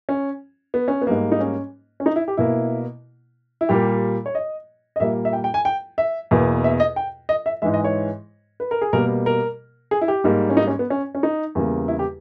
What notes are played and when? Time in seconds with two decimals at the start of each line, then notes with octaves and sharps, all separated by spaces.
0.09 C#4
0.74 B3
0.88 C#4
1.02 B3
1.07 G#2 G3 A#3
1.32 D#4
1.40 C#4
2.00 C#4
2.06 D#4
2.16 E4
2.28 G4
2.37 B2 A#3 E4
3.61 E4
3.69 A#2 G3 A#3 G4
4.26 C#5
4.35 D#5
4.96 D#5
5.00 A#2 G3 A#3 E5
5.25 E5
5.33 G5
5.44 G5
5.54 G#5
5.65 G5
5.98 E5
6.31 E2 B2 A#3
6.64 E5
6.80 D#5
6.96 G5
7.29 D#5
7.46 E5
7.62 G#2 E3 G#3 E5
7.74 D#5
7.84 C#5
8.60 B4
8.71 A#4
8.82 G#4
8.93 B2 G3 A#3 A#4
9.26 A#4
9.91 G#4
10.01 E4
10.08 G4
10.24 G#2 G3 A#3
10.50 C#4
10.57 D#4
10.67 C#4
10.79 B3
10.90 C#4
11.15 C#4
11.23 D#4
11.55 E2 C#3 G3 A#3
11.88 E4
11.99 G4